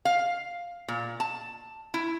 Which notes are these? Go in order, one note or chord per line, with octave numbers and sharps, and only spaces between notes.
F5
A#2
A5
E4